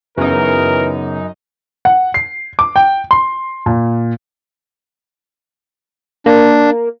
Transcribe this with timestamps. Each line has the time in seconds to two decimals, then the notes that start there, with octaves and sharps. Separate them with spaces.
0.18 F#2 C#3 E3 B3 D#4 A#4 C#5
1.85 F#5
2.14 C7
2.59 D6
2.76 G5
3.11 C6
3.66 A#2
6.26 A#3 D4